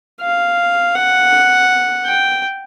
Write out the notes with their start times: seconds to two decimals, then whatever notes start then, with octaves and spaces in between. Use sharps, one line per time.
0.22 F5
0.95 F#5
2.05 G5